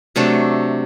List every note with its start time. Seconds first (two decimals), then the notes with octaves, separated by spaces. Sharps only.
0.16 C3 F#3 A3 D4